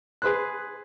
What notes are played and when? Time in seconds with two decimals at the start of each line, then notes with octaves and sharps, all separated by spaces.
0.22 G#4 B4 C5 F#6